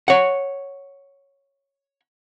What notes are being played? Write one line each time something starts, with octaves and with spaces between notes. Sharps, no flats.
C#5 F#5